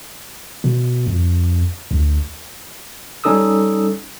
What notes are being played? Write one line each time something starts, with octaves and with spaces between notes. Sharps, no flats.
B2
F2
D2
G3 C#4 D#4 A4 D#6 E6